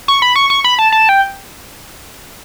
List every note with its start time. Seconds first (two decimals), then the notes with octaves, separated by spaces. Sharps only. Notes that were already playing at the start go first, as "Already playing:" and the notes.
0.08 C#6
0.22 B5
0.36 C#6
0.50 C#6
0.64 B5
0.79 A5
0.92 A5
1.09 G5